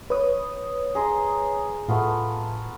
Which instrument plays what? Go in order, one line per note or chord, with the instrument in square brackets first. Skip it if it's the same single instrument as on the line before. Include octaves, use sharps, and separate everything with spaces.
[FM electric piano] B4 C#5 D#6
[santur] G#4 A#5 C6
[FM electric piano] A2 [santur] A3 B3 F4